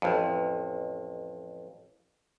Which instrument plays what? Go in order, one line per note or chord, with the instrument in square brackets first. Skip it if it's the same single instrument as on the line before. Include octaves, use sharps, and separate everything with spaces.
[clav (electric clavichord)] A1 F2